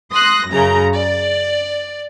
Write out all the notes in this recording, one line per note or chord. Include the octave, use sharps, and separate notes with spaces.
C6 D#6 F#6 A#6
F#2 C#3 A#5
D5